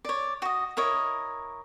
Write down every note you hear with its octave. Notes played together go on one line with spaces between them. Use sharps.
C#5 D5
F#4 D#5
E4 A#4 C#5 D#5